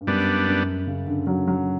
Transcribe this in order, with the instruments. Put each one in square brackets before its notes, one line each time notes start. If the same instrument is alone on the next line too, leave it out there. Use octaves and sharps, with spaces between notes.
[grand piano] G2
[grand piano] F#2 [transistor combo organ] G3 B3 D4
[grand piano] F#2
C#3
D3
F#3
F#3